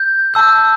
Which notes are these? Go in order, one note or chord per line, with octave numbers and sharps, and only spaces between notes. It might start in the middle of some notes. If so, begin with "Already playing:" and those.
Already playing: G6
A5 E6 G6